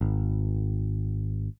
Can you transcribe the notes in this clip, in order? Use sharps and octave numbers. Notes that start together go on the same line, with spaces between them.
G#1